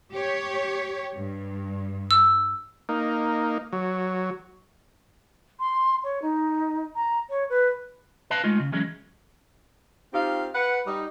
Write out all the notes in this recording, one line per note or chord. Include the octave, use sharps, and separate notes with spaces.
G4 C#5
G2
E6
A#3 D#4
F#3
C6
C#5
D#4
A#5
C#5
B4
B4 D#5 F5 A5
G#3 A3 D#4 F4
C#3
E3 F#3 G#3 C#4
C4 D#4 F4 G4 F5
B4 F#5
G3 D#4